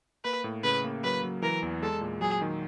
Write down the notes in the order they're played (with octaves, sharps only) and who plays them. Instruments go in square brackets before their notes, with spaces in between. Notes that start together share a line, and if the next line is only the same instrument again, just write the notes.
[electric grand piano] A#3 [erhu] B4
[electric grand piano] A2
[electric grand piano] C#3 [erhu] B4
[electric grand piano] A#3
[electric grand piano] F#3 [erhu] B4
[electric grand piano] F#3
[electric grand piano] E3 [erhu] A#4
[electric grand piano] E2
[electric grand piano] G#3 [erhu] A4
[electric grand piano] A#2
[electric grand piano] F#3 [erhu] G#4
[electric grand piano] D#3